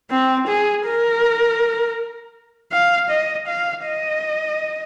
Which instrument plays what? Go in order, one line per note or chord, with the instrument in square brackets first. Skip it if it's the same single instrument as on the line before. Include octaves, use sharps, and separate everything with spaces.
[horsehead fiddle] C4
G#4
A#4
F5
D#5
F5
D#5